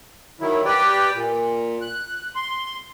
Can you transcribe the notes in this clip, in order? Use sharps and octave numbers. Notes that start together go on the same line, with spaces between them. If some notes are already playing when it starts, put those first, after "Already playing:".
D#3 F#3 E4
G4 B4 D5 G5
A#2
F#6
C6